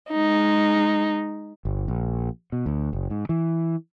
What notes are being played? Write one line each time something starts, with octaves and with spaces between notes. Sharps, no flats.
G#3 D#4
G1
A#1
B2
D2
F#1
G#2
E3